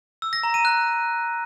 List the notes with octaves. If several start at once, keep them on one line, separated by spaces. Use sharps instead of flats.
E6
A#6
A#5
D#7
F#6